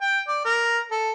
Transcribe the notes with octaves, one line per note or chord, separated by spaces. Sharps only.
G5
D5
A#4
A4